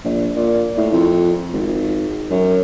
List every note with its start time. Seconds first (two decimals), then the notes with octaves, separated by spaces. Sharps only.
0.04 A#1
0.36 A#2
0.77 A2
0.93 F2
1.53 G#1
2.30 F#2